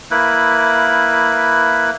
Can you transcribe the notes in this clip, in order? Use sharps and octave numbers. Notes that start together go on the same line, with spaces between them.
A#3 E4 B4